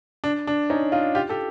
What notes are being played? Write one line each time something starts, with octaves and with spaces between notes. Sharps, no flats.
D4
D4
C#4 D#4
D#4 F4
F4 G4
G4 A4